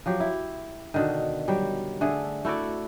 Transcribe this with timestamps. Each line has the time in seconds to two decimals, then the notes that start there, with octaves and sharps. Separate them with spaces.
0.06 F3 F#3 G4
0.20 E4
0.94 B2 D3 D#3
1.48 F#3 G3 G5
2.01 D3 A3 G#4
2.45 A3 E4 F#4 D5